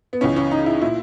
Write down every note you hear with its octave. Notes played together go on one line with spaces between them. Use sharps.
B3
C#2 C#3 E3 C#4
C#4
D#4
E4
A#2 E4